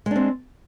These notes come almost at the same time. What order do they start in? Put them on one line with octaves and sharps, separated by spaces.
G#3 D4 C4